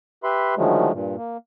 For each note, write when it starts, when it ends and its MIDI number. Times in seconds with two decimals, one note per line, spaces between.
0.24 0.55 67
0.24 0.55 71
0.24 0.55 76
0.24 0.55 83
0.24 0.55 84
0.57 0.92 50
0.57 0.92 51
0.57 0.92 53
0.57 0.92 54
0.57 0.92 56
0.57 0.92 57
0.92 1.16 43
0.92 1.16 46
1.17 1.37 58